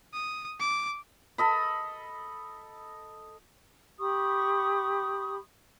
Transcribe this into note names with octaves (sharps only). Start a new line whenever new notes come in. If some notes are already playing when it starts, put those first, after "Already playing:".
D#6
D6
A4 D#5 B5
G4 B5 C#6 D#6